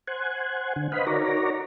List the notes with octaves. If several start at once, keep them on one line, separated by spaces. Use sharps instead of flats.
C5 F#5 G#5
D3
B4 C5 D#5 F5 F#5 B5
D#4 F#4 A#4 C#5 D5 A#5